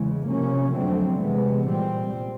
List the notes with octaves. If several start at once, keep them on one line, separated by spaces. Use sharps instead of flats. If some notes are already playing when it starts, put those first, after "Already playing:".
Already playing: E2 C#3 E3 G#3
C3 F3 A#3 C#4
F2 D3 F#3 A3 C4
C3 E3 G#3 B3
A#2 G3 C4